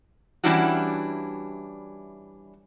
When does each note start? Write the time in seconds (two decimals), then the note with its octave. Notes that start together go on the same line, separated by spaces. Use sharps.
0.44 E3 G3 C#4 D4 E4 F#4